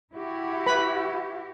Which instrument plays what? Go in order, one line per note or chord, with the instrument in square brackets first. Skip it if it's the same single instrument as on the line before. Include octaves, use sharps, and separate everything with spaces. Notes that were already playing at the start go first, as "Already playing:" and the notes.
[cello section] E4 F#4 G4
[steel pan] B4 B5